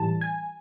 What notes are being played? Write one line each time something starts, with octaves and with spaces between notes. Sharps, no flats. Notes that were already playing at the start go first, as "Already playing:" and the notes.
Already playing: A2 E3 G3 A5
G#5